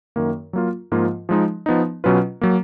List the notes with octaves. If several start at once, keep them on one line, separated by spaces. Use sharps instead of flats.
F#2 D#3 A#3
F#3 A#3 F4
G#2 F3 A#3 F4
F3 G#3 D#4
F3 B3 D#4
B2 F#3 C#4 F4 B4
F#3 A#3